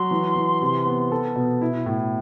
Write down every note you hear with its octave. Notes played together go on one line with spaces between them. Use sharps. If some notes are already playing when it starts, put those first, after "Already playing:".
Already playing: F#3 C6
E3
E3
C3
B3
A4
B2
E4
A2